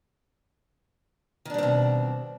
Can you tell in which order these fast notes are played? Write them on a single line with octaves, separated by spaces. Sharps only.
D#3 D4 G3 C4 B2